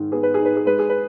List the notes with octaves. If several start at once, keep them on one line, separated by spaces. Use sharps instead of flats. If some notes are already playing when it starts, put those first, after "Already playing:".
Already playing: G#2 D#3
B3 G#4
B4
D#4 G#4
B4
G#4
G#3 B4
G#4
B4